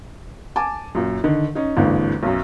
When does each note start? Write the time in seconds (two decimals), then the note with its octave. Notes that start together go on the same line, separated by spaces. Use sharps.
0.56 G#5 A5 D6
0.95 F#2 A#2
1.24 D3 D#3
1.55 C#4 D#4
1.77 G#1 D#2 D3 E3
2.23 B1 F#2